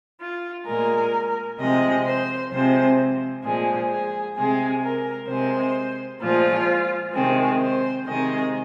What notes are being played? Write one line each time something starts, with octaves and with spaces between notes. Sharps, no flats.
F4
A#2 G#3 A#4
C3 F3 G#3 D#5
C5
C3 F3 G#3 C5
A#2 F3 G#3 G#4
G#4
C3 G#3 G#4
A#4
C3 G#3 C5
A#2 F3 G#3 F4
C3 D#3 G#3 C4
C5
C3 D#3 G#3 D#5